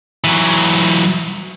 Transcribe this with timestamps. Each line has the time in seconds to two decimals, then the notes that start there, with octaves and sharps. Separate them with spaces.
0.24 E3 F#3